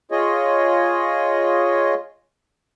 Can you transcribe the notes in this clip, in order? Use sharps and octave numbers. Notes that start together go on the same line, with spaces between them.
F4 G#4 C#5 D#5